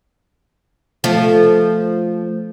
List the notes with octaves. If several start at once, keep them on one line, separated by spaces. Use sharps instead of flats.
F3 A3